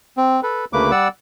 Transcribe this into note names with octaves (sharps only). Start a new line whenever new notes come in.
C4
A4 B4
D2 C#3 A3 A#3 B4 D6
G3 D5 F#5 E6